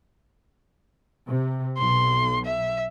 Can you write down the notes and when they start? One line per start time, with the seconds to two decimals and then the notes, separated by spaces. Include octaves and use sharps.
1.28 C3
1.78 B1 C6
2.45 E5